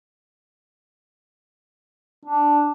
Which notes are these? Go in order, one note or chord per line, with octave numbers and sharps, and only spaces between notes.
D4